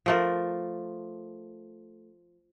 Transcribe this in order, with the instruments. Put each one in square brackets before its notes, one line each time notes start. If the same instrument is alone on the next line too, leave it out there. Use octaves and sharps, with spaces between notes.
[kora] F3 A3 A#4